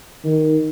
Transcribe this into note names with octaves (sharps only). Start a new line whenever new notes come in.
D#3